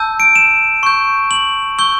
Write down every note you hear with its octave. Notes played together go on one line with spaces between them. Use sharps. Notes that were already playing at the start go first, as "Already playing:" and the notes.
Already playing: A5 E6 G6
D7
E7
C#6 G6
F#7
C#6 E6 G6 G7